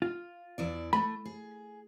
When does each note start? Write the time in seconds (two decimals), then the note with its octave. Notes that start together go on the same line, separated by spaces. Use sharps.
0.02 F4
0.58 E2 E4 D5
0.93 A3 B5
1.25 G#4